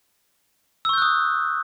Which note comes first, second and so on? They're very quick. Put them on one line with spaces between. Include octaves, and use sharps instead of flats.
E6 C#6 G6 F#6 D#6